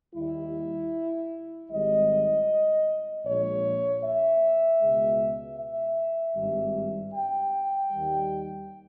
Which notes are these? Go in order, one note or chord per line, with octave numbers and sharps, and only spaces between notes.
D#2 D#3 G3 E4
G#1 G#2 G3 D#5
A#1 A#2 G#3 C#5
E5
C#2 B2 G#3
E5
G#1 G2 G3
G5
D#2 D#3 G3